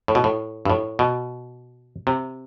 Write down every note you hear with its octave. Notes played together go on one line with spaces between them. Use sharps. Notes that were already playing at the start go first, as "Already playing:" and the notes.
A2
B2
A2
G2
A2
B2
C3